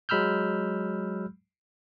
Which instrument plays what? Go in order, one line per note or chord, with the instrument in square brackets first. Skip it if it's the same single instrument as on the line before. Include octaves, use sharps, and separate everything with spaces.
[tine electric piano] F#3 G#3 B5 E6 F6 G6